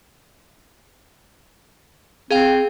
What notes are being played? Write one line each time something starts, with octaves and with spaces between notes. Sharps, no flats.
C4 G#4 F5 G5